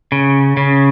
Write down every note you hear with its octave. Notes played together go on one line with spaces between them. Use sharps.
C#3
C#3